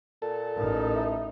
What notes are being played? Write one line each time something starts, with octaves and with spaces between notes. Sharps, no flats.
A#2 A4
A1 D#4 A#4
E4